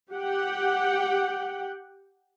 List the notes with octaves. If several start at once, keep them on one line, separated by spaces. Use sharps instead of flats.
G4 F#5 G5